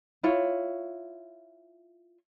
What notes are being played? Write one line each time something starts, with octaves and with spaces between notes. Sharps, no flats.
E4 F4 C#5